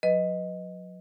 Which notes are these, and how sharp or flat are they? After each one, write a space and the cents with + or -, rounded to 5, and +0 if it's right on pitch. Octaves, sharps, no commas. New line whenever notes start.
F#3 -35 B4 +0 D#5 +5